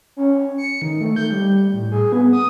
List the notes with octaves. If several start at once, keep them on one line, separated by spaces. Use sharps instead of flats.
C#4
C#7
D#3
A3
G6
G3
A2
G#4
B3
D#6